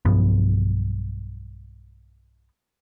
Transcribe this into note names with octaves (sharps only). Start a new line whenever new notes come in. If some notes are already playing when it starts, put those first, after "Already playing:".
B1 G2 F3 B3